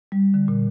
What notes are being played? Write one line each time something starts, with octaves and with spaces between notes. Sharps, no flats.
G3
D3
A#2